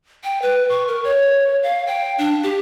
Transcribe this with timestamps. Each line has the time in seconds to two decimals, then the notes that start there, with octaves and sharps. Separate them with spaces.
0.24 G5
0.42 B4
0.69 C#6
0.88 A#4
1.04 C#5
1.63 F5
1.87 G5
2.18 D4
2.43 G4